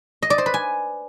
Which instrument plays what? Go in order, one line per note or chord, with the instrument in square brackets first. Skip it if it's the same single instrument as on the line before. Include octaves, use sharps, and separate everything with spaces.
[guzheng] D#5
D5
C5
B4
G#5